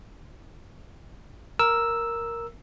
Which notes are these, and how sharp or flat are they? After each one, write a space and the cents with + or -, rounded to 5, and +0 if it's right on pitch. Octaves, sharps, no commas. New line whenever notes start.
A#4 +0 E6 +0